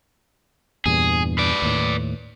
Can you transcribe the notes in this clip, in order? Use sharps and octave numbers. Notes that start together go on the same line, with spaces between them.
E2 G2 A#2 G#4
B4 D5
D#2 A2